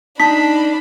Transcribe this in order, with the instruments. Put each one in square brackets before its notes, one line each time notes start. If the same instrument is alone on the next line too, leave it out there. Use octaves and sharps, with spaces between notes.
[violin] D4 B5 [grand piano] D#4 [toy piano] A5 [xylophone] B6